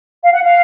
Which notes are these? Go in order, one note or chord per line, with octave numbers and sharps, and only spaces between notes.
F5
F#5
F5